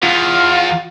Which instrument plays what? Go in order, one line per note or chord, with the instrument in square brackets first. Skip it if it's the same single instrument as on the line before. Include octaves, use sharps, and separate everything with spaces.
[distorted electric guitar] E2 [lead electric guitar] F4